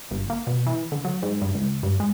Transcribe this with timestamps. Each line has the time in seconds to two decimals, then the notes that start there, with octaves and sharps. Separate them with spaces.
0.11 G1
0.30 A#3
0.47 B2
0.66 E3
0.92 D3
1.05 F#3
1.22 G#2
1.41 G2
1.55 C#2
1.83 G2
2.00 G#3